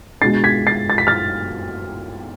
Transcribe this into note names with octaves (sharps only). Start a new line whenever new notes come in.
B2 G#3 D4 A6 C7
G#6 B6
A6 C7
A6
B6
F6 A6